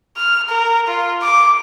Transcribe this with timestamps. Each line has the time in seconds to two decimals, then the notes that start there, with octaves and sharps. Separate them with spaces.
0.17 F6
0.49 A#4
0.87 F4
1.22 D6